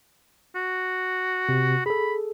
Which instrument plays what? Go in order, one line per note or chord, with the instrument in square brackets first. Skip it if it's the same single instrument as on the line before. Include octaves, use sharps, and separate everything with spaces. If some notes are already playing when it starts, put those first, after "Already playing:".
[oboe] F#4
[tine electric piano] C3
[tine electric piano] G#4 A4 [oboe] B5